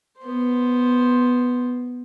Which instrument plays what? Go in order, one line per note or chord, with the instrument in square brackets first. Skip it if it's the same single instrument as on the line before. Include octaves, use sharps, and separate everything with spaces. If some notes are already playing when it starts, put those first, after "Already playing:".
[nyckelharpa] B3 C5